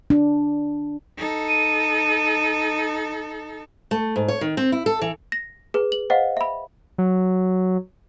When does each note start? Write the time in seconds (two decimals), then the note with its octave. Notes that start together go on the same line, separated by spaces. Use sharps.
0.10 D4
1.18 D#4 A4
1.48 D#7
3.91 A3
4.16 G#2
4.28 C#5
4.41 D#3
4.57 C4
4.72 E4
4.86 A4
5.01 E3
5.32 A#6
5.74 G#4 B4
5.92 F#7
6.10 C5 D#5 F5 F#5
6.37 E5 B5
6.98 F#3